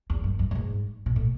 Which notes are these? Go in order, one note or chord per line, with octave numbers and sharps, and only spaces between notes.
E2
F#2
F#2
F#2
G#2
B2
A2